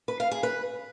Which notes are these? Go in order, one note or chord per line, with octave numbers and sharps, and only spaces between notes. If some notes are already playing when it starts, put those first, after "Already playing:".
B4
F5
G#4
B4